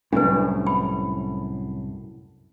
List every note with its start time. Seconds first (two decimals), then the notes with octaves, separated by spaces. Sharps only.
0.13 C2 F#2 A2 D4 B4
0.67 B5